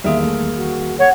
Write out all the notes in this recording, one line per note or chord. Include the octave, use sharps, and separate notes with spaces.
E2 D#3 G3 A#3 G#4 A#4 E5
A3
F#4
C#5 F#5